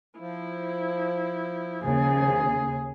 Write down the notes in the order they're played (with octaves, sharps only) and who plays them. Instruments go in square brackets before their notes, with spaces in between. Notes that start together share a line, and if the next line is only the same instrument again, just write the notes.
[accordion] F3 [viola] E4
[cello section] D#2 C#3 [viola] G#4